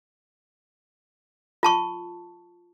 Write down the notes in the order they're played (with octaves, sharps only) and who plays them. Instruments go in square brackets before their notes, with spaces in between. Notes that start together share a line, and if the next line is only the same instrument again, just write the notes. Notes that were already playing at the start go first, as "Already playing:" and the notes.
[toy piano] F4 A5 C#6